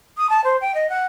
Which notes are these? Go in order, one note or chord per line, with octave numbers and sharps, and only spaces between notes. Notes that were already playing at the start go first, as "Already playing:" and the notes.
D#6
A5
C5
G5
D#5
F#5